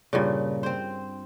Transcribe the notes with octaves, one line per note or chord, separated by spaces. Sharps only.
G2 A#2 C#3
C4 C5